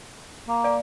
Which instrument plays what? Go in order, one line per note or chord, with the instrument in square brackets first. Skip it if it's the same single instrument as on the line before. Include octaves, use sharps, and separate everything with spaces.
[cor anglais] A#3
[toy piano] D5 F5 G#5